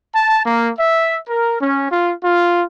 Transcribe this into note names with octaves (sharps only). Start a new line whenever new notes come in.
A5
A#3
E5
A#4
C#4
F4
F4